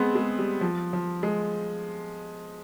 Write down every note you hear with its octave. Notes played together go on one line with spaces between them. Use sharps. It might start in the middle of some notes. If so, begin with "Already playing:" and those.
Already playing: G#3 B3 C4
G#3
G3
F3
F3
G#3